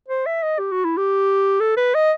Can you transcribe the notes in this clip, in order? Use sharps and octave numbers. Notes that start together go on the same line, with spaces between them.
C5
E5
D#5
G4
F#4
E4
G4
A4
B4
D#5